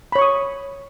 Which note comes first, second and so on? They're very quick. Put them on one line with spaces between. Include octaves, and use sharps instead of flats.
B5 C#5 C#6 D#6